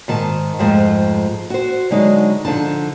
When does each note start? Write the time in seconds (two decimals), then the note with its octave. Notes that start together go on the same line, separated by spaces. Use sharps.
0.08 G#2 D#3 A5
0.59 F2 G#2 F3 G#3 A3
1.50 F#4 C5
1.91 D3 F#3 G#3 D#4
2.45 D3 F3 D#4 A5